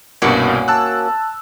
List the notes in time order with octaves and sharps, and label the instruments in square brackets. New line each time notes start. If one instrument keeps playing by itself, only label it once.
[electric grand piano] C2 G2 B2 [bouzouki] A#3 C#4 F#4
[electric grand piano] A5 E6 F#6